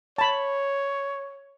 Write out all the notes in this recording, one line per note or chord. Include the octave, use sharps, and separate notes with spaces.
C#5 A5 B5